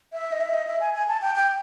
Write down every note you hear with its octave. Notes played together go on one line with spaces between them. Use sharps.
E5
D#5
E5
D#5
E5
G#5
G#5
A5
G5
G5